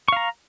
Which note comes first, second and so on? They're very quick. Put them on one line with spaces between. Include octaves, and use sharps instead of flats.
C#6 F5 A#5